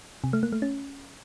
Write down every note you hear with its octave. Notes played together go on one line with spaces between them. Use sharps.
C3
A3
A#3
A3
C#4